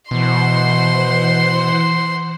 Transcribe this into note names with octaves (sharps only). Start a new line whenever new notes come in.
B2 E3 C5 F#5 C6